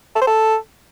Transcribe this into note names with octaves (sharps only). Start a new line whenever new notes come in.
A4
C5
A4